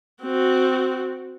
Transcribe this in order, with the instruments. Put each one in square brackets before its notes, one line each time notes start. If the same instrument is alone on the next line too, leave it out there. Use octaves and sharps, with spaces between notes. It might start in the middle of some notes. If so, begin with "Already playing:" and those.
[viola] C4 F#4